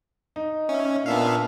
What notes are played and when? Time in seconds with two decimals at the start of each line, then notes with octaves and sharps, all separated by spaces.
0.36 D#4
0.69 C#4 E5
1.06 A#2 B3 D4 E5 F5